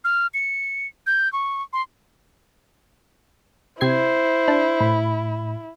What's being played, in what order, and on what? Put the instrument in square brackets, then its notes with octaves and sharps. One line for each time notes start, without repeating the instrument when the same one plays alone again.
[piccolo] F6
C#7
G6
C#6
C6
[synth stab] C3 G#6 C7 [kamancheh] E4 [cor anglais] C5
[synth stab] D4
[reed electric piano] A2 B5